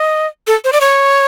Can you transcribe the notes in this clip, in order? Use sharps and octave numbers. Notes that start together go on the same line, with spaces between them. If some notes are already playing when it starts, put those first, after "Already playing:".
Already playing: D#5
A4
C5
D5
C#5